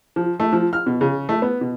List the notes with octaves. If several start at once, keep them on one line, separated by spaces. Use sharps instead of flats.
F3
A3
F3
F6
B2
C#3
A3
B3
B2